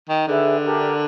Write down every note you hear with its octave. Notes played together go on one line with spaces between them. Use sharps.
D#3
D3 G#4 B4 E5
D4 G4 A#4